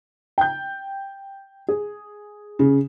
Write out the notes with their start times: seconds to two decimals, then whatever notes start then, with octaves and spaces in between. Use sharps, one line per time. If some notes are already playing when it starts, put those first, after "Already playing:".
0.38 G5 G6
1.68 G#4
2.59 C#3